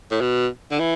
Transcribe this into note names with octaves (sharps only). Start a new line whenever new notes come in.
A2
B2
D3
E3